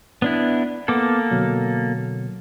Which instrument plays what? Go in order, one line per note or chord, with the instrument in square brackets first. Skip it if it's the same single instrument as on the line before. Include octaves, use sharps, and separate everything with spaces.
[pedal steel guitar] B3 D4 E4
[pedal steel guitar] A#3 A4 [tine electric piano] B3 D6
[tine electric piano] B2 D3 F#3